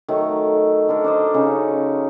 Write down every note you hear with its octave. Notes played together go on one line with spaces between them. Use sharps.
D#3 F#3 A3
D3 A4 A#4
D4 C5 D#5
C#3 D#4